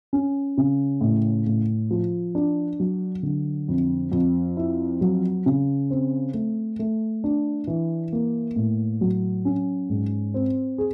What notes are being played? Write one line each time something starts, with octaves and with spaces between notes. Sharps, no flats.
C#4
C#3
A2
A2
F3
D4
F#3
D3
F2
F2
E4
F#3
C#3
C4
A3
A3
D4
E3
A#3
A2
F#3
C#4
G#2
C4
G#4